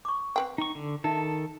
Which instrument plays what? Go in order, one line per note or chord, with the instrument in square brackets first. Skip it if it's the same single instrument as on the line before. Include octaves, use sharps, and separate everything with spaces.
[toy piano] C#6 D6
[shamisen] C4 B4 G5 [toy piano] F#5
[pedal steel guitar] D#4 C#6
D3
[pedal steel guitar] D#3 A4 [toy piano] D#4 E5